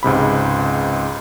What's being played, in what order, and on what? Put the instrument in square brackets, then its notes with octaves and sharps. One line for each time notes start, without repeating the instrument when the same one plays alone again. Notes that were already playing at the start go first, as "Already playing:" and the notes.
[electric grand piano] C#2 G#2 C3 B5